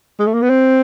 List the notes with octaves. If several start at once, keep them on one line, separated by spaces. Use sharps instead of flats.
G#3
A3
A#3
B3
C4